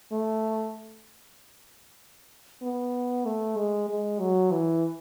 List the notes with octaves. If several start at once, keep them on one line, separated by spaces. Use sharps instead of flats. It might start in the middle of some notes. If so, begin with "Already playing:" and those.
A3
B3
A3
G#3
G#3
F#3
E3